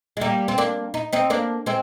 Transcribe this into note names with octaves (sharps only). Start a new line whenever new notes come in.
G#3
G3 A#3
C4
A#3 D4
D#4
C4 D#4
A#3 D4
G#3 C4